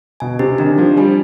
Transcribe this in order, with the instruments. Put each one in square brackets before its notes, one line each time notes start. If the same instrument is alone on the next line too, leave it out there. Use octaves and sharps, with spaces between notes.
[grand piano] B2 [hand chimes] G#5
[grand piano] C3 [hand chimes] G4
[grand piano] D#3 [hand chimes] D4
[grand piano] F3 [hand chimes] D4
[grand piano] G3 [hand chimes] G#5